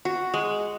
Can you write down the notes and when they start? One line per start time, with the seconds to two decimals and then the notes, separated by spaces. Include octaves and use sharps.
0.05 F#4
0.34 G#3